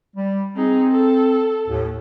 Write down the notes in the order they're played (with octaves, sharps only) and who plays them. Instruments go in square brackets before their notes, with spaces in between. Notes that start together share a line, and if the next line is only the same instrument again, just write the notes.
[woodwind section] G3
[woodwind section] C4 [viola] D#4 G#4
[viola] A4
[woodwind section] D#2 A2